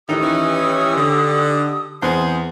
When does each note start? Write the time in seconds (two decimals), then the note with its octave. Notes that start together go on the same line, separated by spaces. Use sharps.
0.09 A2 D#3 E3 D#4 G4 D#6 E6
0.21 E3 C#4
0.95 D3
2.02 E2 C4 G#4 C5